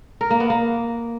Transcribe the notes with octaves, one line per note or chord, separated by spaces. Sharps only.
A#4
A#3
B3
A#3